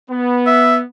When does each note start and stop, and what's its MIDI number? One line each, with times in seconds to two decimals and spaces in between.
0.10 0.83 59
0.46 0.77 76